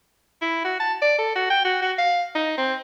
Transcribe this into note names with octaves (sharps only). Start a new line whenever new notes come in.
E4
F#4
A5
D5
A4
F#4
G5
F#4
F#4
F5
D#4
C4